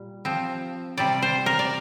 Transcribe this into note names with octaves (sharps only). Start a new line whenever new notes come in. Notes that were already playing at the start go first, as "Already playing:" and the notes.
Already playing: A#2 G3
F3 C4
C3 G3 C4 D5
C5
A#4
D5